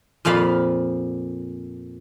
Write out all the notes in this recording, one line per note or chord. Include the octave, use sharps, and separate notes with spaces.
F2 A#2 F3 F5 B5